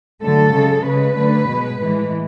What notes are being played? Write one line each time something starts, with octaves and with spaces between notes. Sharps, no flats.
D3 F#3 A3 A4
C#3 G#3
C#3 G#3 B4
D3 F#3 A3
B2 G#3
A2 E3 G#3